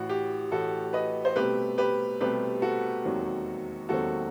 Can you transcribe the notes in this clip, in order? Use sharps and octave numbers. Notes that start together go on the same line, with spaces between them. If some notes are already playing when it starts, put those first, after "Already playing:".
Already playing: A1 A2 E3 F#4
G4
A1 A2 E3 F#4 A4
B4 D#5
C5
C2 B2 A3 C4 G4 B4
G4 B4
C2 B2 A3 C4 G4 B4
F#4 A4
E1 D#2 D#3 F#3 C4
E1 D#2 D#3 F#3 C4 F#4 A4